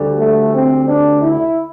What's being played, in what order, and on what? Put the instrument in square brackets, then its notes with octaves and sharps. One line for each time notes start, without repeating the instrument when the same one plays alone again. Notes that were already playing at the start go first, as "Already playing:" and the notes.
Already playing: [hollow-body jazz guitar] D2 D3 G3
[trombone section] A3
C4
D4
E4